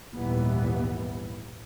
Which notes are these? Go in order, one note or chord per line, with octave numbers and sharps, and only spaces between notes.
A#1 D#2 G#2 E3 G3 B3